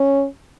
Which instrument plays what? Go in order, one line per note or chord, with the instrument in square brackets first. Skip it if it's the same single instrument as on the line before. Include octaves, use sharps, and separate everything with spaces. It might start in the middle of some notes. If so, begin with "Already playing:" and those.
Already playing: [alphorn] C#4